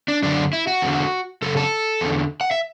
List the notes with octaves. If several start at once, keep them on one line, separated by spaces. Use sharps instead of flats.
D4
F#2 D3 D4
E4
F#4
E2 D3
F#2 C#3 A4
A4
E2 D3
F#5
E5